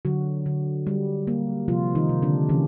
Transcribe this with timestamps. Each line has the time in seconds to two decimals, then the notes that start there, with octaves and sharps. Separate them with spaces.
0.05 D3 F#3 F#4
0.46 D3
0.87 G3
1.27 A#3
1.68 C3 F3 F4
1.95 D#3 D#4
2.09 C3
2.22 D3 D4
2.49 C#3 E3 C#4